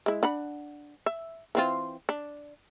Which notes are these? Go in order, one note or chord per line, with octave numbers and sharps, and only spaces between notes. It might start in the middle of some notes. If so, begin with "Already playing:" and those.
G#3 E4
D4 F#5 B5
E5
E3 C4 F4
D4